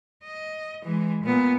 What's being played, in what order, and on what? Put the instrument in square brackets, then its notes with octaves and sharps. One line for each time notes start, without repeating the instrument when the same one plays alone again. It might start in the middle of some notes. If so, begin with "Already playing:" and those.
[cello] D#5
E3 G#3
A#2 B3